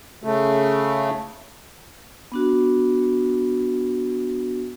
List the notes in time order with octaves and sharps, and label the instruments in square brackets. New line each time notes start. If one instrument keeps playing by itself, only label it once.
[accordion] C#3 A3
[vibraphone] B3 D4 F#4